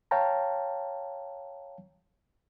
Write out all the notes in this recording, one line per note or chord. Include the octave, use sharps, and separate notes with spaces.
C#5 F5 G5 A5 A#5